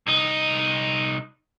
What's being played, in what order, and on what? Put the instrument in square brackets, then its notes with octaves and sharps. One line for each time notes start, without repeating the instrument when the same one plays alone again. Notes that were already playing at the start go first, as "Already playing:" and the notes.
[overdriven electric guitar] C2 D#4